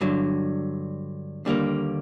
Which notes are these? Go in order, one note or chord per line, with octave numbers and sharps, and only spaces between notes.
G2 D3 F#3
D#2 D3 G3 A#3